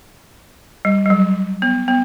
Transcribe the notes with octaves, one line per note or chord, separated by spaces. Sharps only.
G3
G3
F#3
B3
B3